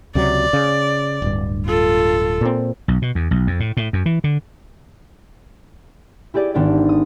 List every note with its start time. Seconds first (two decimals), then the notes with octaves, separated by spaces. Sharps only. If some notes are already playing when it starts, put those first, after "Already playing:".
0.15 C#2 C3 F#3 D5
0.53 C#3
1.22 D1 G2
1.66 F4 A4
2.41 A#2 C4
2.88 B1
3.02 B2
3.15 E2
3.31 B1
3.47 F2
3.60 A2
3.77 A2
3.93 F#2
4.06 E3
4.24 D3
6.34 E4 G4 G#4 D5
6.54 G#1 B3 D4 D5
6.89 D#6